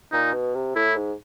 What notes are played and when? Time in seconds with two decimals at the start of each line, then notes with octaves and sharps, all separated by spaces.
0.12 A#2 D#4
0.33 B2
0.55 C3
0.75 A2 E4
0.96 G#2